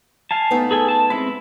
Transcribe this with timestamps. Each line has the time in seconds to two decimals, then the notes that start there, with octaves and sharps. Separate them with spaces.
0.31 F5 G#5 A5
0.51 A3 B3 D#4
0.71 G#4 A4 G#5
0.89 A5
1.10 G#3 C4 E4 B4